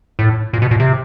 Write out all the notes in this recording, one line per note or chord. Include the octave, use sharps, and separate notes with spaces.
A2
A#2
B2
A#2
C3